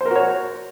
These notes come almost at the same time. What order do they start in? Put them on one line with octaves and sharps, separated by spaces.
C5 A#4 F#4 C#5